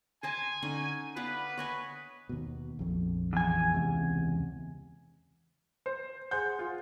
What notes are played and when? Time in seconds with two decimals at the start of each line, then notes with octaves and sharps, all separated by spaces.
0.23 C5 D#5 G#5 A5
0.62 D3 C#4 D#4
1.16 B3 B4 D5 F5
1.57 C#5 D#5 G#5
2.29 D#2 B2
2.79 A#1 F2
3.33 E2 G#5
3.74 C#2 C3
5.86 C5
6.31 G#4 C5 F#5 G6
6.59 F4